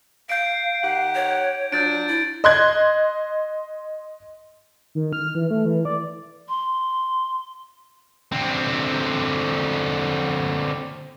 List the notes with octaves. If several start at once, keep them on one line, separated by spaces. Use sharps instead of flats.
F5 G6 D7
D#3 G4 F#5
C#5
F3 F#3 D4 G6 A6 D7
E4
D#5 C6 F#6 G#6
D#3
F6
E3
A3
E3
D5
C6
D3 C4